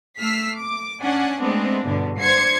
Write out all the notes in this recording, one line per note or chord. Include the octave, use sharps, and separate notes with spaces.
A3 E6 F6 B6 C7
D6
C#4 D4 D5 F#5 G#5
G#3 A3 B3 C4 D4
E2 G2 B2 D3
D4 C5 G#6 C7 C#7